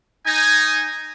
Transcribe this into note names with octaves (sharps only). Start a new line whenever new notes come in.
D#4 G#5